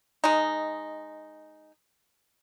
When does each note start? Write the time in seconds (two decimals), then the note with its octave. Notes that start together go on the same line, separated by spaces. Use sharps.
0.24 G#3 D#4